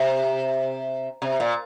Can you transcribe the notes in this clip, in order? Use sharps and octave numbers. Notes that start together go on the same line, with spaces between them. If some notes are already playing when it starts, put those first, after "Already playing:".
Already playing: C3
C3
A#2